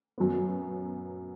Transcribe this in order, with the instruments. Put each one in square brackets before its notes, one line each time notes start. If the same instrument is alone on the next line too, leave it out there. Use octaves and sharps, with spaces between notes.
[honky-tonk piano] F#2 F#3 B3